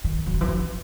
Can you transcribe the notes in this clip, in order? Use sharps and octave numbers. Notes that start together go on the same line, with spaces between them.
D#3
E3
D#3
E3
F3